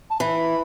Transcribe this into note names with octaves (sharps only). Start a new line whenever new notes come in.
A5
E3 B5